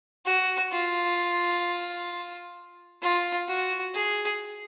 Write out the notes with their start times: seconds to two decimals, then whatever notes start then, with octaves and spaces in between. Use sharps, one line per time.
0.26 F#4
0.72 F4
3.03 F4
3.49 F#4
3.95 G#4